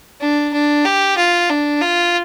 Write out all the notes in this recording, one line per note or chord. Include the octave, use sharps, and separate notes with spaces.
D4
D4
G4
F4
D4
F4